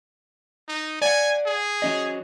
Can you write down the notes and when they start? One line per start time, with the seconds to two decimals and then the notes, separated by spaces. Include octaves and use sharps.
0.68 D#4
1.02 D5 F#5 G#5
1.46 G#4
1.82 F#3 C#4 D#5